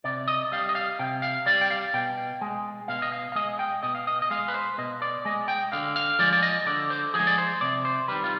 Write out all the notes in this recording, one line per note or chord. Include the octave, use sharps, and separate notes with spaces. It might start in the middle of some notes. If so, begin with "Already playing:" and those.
C3 D5
D#5
G3 F5
D#5
F5
C3 G5
F5
G3 D5
G5
F5
B2 G5
G#3
B2 F5
D#5
F5
F5
G#3 D#5
G5
B2 D#5
F5
D#5
D#5
G#3 F5
B4
C5
B2 D#5
D5
G#3 D#5
G5
D3 F5
F5
F3 G#3 D5
D5
D#5
D3 D5
C5
F3 G#3 G#4
D5
C5
C3 D5
C5
D#3 G3 B4
F4